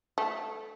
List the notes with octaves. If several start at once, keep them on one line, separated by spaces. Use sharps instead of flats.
A3